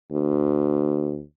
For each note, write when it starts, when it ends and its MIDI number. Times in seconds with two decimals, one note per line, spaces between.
0.12 1.22 38